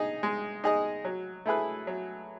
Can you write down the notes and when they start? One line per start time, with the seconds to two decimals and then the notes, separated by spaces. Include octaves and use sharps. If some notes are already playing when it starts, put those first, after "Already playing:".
Already playing: D#4 G#4 D#5
0.23 G#3
0.64 D#4 G#4 D#5
1.05 F#3
1.46 A3 E4 G#4 B4
1.87 F#3